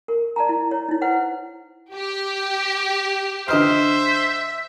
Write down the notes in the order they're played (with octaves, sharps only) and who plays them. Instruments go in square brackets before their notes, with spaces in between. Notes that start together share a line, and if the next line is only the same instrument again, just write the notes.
[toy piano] A#4
D5 A5 A#5
E4
C#5
D#4 E4
B4 C5 F#5
[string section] G4
[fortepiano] D3 D#5 F6 [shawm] C5 [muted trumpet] E5